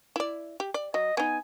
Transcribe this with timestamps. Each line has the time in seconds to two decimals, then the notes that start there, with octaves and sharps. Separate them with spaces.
0.16 E4 D5
0.60 G4
0.74 D5
0.94 F#3 D#5
1.17 B3 D#4 G#5